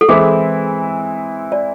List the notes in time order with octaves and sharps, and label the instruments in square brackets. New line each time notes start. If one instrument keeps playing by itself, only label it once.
[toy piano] A4
[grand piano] E3 G#3 C4 E4 [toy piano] G#4
[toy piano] D5